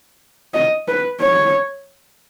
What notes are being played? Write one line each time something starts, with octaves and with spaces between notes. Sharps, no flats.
D#5
B4
C#5